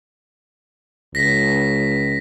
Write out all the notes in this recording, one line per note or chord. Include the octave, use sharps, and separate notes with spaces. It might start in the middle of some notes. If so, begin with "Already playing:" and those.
C#2 A#6 B6